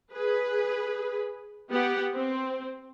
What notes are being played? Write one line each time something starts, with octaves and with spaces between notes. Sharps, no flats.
G#4 B4
B3 G4 F#5
C4